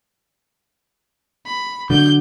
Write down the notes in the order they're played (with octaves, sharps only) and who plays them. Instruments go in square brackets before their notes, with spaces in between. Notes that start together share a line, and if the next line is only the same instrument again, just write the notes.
[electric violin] B5
[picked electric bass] D3 F#3 [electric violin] G6